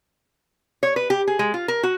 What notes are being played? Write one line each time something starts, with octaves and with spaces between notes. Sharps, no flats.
C#5
B4
G4
G#4
G#3
F4
A#4
F#4